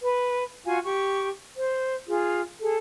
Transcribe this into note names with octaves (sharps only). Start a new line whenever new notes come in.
B4
F4 F#4 F5 G#5
G4 C#6
C5
F4 G#4
G#4 A4